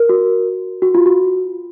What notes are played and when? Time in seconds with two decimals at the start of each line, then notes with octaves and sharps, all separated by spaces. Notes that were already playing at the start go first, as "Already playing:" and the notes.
Already playing: A#4
0.09 F#4
0.82 F#4
0.95 F4
1.06 F#4